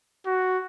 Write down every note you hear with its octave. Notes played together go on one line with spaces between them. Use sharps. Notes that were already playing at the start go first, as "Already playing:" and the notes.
F#4